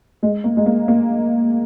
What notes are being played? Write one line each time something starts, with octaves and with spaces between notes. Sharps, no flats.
G#3
A#3
G#3
A#3
A#3